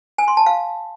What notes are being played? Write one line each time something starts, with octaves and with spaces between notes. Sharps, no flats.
G#5
C6
A5
F5